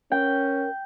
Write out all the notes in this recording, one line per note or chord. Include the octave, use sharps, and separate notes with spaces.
C#4 A#4 G5